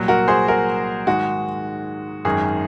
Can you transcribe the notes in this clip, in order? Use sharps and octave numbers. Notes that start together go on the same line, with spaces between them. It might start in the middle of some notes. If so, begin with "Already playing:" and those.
Already playing: C2 A#2 F#3
F#4 A#4
G#4 C5
F#4 A#4
G#2 D#3 G#3 F#4
G#1 F#2 D#3 G#4